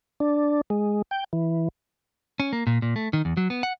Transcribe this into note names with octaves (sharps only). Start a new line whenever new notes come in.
D4
G#3
G5
E3
C#4
A#3
A#2
A#2
A3
D#3
E2
F#3
B3
F#5